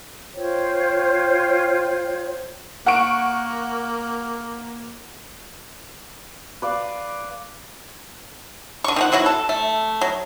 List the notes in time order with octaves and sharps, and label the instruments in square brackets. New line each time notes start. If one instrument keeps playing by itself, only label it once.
[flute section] F4 C5 C#5 G5
[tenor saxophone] A#3 [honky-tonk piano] F#5 C#6 D7
[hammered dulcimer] B4 D5 F5
[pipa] D3 C#6
D#3 F3 F#5
B2 F#3 E4 F#4
A4
A3
F#3